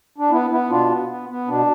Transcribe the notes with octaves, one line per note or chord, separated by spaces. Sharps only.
D4
B3 E4
B3 E4
B2 D4 F4
B3
B3
B3
B2 D4